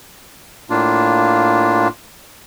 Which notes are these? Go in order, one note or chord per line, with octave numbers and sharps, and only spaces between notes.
A2 A#3 D4 F4